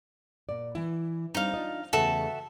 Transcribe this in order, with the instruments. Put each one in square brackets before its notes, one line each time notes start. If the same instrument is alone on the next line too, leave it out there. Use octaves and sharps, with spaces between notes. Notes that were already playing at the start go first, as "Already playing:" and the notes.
[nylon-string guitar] A#2 D5
E3 E4
[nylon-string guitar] G3 C4 D4 [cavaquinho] D#4 F5
[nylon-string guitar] D4 F4 D#5
[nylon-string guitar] E2 C#3 A3 [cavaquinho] F#4 A4 E5